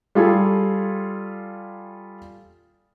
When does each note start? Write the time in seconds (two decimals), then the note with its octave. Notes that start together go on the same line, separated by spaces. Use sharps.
0.15 G3 F4 G#4 A4